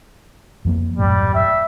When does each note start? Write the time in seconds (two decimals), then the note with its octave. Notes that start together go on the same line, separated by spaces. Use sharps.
0.65 F2 F3 A#3
0.98 D#1 F#2 A2 G3
1.35 E5